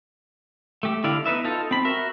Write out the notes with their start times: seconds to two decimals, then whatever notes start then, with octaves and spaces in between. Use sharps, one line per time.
0.83 A3 G4
1.04 D3 E4 D5 F5
1.26 B3 D#4 B4 E5
1.44 D#4 F4 A4
1.71 C4 B5
1.85 F#4 A#4 E5